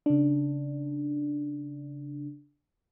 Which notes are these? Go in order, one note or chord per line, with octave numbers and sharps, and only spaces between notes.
C#3 D4